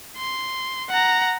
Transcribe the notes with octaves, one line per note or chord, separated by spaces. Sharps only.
C6
F#5 A#5